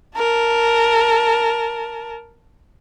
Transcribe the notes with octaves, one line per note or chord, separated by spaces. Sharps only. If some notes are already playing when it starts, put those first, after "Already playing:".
A#4 A5